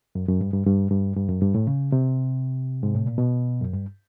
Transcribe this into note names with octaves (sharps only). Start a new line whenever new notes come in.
F#2
F#2
G2
G2
G2
G2
G2
F#2
G2
A2
C#3
C3
G#2
A2
A#2
B2
F#2
G2